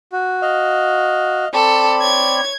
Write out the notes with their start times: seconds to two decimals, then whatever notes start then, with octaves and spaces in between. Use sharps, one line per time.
0.12 F#4
0.42 D#5 F5
1.54 C4 A4 D5 B5 C#6
2.02 C#5 G#6